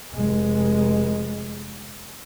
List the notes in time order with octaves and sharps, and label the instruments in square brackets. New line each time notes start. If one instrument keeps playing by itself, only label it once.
[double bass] F1 G#3